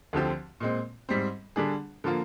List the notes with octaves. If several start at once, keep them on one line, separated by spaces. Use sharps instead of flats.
D2 D3 F3 C4 G4
A#2 G#3 C4
G#2 G3 C4
D3 G3 D4 G#4
D3 F3 A#3 F4